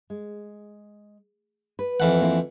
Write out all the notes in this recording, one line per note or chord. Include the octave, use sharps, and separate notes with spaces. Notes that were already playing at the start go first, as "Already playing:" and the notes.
G#3
B4
F2 E3 F#5
A#3 C4 E4